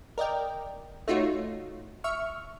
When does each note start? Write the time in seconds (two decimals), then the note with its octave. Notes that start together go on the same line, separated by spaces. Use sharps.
0.18 A#4 D5 D#5 G5
1.08 A3 D#4 F4 F#4 C#5
2.04 E5 C#6 F6